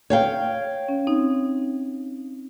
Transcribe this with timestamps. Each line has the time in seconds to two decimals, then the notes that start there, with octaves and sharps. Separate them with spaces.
0.10 C#5 F5 G5
0.89 C#4
1.07 C4 D#4